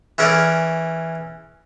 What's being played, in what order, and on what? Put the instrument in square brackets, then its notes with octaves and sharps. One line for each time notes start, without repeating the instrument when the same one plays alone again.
[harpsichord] E3 C#4 G#4 A#4 D5